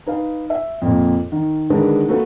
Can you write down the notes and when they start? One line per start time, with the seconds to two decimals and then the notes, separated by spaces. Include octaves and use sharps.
0.06 D#4 B4 F5
0.50 E5
0.82 F2 A#2
1.32 D#3
1.70 D3 D#3 G#3 D4 A#4 B4
2.09 A3 A#3 F#4 A4 B4